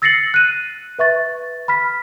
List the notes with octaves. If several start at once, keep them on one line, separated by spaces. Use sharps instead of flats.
E6 A6 A#6 C7 C#7 F#7
F#6 D#7
B4 E5 C#6 A6
B5 F6 B6